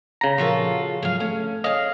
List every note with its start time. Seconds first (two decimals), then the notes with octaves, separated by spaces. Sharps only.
0.21 C#3 A#5
0.38 A#2 F3 F4 F#4 A4 A#4
0.83 G#4
1.03 G#2 F3 F#3 G#4 F5
1.20 A3 C#4 A4
1.64 G#4 C#5 D#5 F5